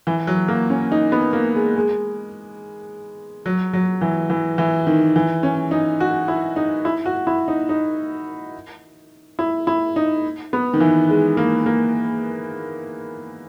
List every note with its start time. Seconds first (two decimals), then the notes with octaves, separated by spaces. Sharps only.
0.07 E3
0.27 F#3
0.48 A#3
0.70 C#4
0.92 D#4
1.12 B3
1.33 A#3
1.55 G#3
1.76 G#3
3.46 F#3
3.73 F#3
4.01 E3
4.30 E3
4.58 E3
4.87 D#3
5.16 E3
5.43 C#4
5.71 D#4
6.00 F#4
6.28 E4
6.56 D#4
6.85 E4
7.06 F#4
7.27 E4
7.48 D#4
7.69 D#4
9.39 E4
9.67 E4
9.96 D#4
10.53 B3
10.73 D#3
10.80 E3
11.09 G#3
11.37 A#3
11.66 A#3